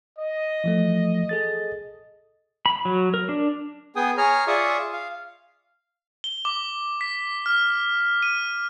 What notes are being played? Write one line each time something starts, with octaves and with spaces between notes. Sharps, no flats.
D#5
E3 F3 A3
G#4 A4 A6
B5
F#3
A#4
D4
B3 G#4 G5 G#5 D#6
G#4 C#5 G#5 A#5 F6
F4 G#4 D5 E5 C#6 D#6
F5
G7
D6
B6
F6
D#7